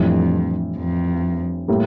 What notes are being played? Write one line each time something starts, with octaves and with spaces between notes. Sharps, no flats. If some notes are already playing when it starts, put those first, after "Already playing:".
Already playing: F2 A2 E3 G3 D4
F2
A2 G3 A#3